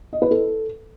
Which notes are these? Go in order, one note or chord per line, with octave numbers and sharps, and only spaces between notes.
D#5
B4
A4